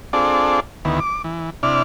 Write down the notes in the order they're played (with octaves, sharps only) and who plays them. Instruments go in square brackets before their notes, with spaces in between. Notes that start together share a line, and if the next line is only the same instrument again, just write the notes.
[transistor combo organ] C4 D4 F4 G#4 A4 D5
D2 D#3 B3 E4
D6
E3
C3 D4 E4 D5 F6